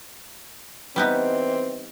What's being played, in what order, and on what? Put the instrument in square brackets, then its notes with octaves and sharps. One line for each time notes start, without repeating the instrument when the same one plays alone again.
[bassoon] E3 [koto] G3 B3 D#4 [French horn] C4